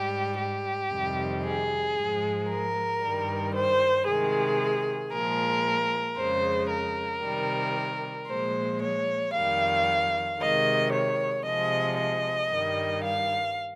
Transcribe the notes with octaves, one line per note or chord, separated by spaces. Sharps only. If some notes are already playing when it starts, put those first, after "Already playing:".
Already playing: G#2 G3 G4
G4
F2 C3 D#3 G3
G#4
G#2 F3 G#3
A#4
G2 D#3 G3
C5
C3 D#3 G#3 G#4
A#2 F3 G#3 A#4
F2 C#3 G#3 C5
A#4
C3 D#3 G3
A#2 F3 G#3 C5
C#5
F2 D#3 G3 F5
C3 D#3 G#3 D#5
C#5
C3 F3 G#3 D#5
D#5
G2 D#3 G3
F5